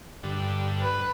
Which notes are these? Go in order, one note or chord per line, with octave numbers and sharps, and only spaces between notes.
G2 D3
B4